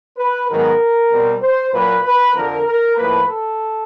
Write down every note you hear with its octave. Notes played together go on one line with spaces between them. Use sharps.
B4
G#2 D#3 F#3 B3 A#4
B2 G3 C4
C5
A#2 F#3 A#3 B4
B4
F2 D3 F3 A#4
A#4
A2 F3 A#3 B4
A4